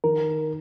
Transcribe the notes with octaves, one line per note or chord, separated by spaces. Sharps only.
D#3 A#4